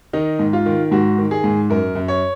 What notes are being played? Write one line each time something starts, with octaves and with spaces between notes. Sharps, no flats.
D#3 D#4
G#2
F4
D#3
G#2 F#4
D#3
G#4
G#2
F#2 A#4
F#2
C#5